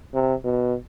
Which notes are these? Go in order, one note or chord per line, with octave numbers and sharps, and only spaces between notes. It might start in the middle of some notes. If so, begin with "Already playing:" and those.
C3
B2